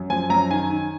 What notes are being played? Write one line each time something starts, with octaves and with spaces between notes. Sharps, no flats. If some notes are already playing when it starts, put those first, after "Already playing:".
Already playing: F#2
F3 G#5
F#2 A#5
D#3 G#5
D#3